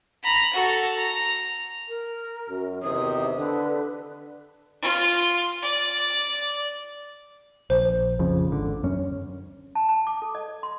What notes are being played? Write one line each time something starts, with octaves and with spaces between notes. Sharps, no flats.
A#5 B5
F#4 A4
A#5
A#4
F#2
E2 C3 D#3 D#6
D3 B4
F4
D5
A#1 C5
F2 C#3 F3
G#1 D3
F#2 C#4
A5
A5
D6
A4
D#5
C6